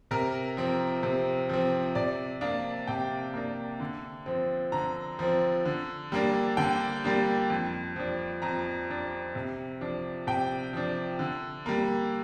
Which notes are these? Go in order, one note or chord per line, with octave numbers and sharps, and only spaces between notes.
C3 A#4
F3 C4
C3
F3 C4
C3 D5
A#3 D4 F5
C3 G5
A#3 D4
D3
F3 C4
D3 A#5
F3 C4
D3
G3 A#3 D4
D3 G5
G3 A#3 D4
F2
F3 D4
F2 A#5
F3 D4
C3
F3 D4
C3 G5
F3 D4
D3
G3 A#3